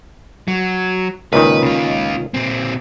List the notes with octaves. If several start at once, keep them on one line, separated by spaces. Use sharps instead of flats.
F#3
C#2 A#2 D#3 B4
C#3 F4
A#2 C4